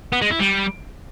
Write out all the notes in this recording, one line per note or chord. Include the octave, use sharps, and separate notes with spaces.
B3
G#3
E4
G3